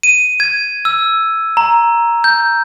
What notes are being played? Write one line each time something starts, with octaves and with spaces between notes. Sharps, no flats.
D#7
G#6
E6
A#5
G6